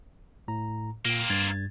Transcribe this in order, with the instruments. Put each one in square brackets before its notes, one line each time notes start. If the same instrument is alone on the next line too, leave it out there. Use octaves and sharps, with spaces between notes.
[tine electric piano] A2 A#5
[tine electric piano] A#2 [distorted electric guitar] A#3 C4
[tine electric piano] G2 G#6 A6